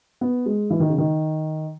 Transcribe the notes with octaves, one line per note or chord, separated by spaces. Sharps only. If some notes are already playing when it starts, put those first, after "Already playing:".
B3
G#3
E3
D#3
C#3
D#3